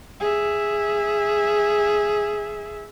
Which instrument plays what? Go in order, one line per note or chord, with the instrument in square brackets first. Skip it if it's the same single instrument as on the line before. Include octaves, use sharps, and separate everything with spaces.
[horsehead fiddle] G#4 E5